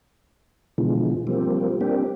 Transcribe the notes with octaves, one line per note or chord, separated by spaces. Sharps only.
B2 D3 E3 F3 G#3
F3 G3 A#3 C4
A#3 C4 D4 G4